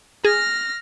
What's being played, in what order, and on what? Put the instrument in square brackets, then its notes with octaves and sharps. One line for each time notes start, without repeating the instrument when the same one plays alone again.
[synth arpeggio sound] G#4 [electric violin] F6 A#6